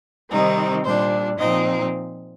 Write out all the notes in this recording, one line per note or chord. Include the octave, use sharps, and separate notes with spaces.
C3 D#3 G3 C4 D#4
A#2 G3 D4 C5
A#2 F3 C4 D#4 D#5